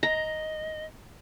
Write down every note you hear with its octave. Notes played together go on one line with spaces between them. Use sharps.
D#5 A#5